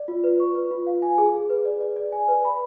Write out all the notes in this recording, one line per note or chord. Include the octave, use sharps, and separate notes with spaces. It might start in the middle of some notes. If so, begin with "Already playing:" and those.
Already playing: D5
F4
B4
C#6
B4
F4
F5
G#5
G#4
G#4
B4
D5
D5
D5
G#5
B4
B5